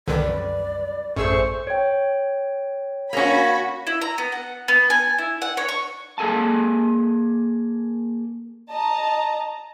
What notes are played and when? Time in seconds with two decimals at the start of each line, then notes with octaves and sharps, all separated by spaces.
0.08 C2 F#2 D3 D#3 B4 D5
1.16 A1 F#2 A3 G#4 C5 C#6 E6
1.67 C#5 G5
3.13 A#3 C#4 F#4 B5
3.87 E4
4.01 A#5
4.18 B3
4.32 F#5
4.68 B3
4.90 G#5
5.18 E4
5.42 F#5
5.57 C#5
5.68 C#6
6.18 A#3 G#4 A4 G#5 A5
8.71 D#5 A5 A#5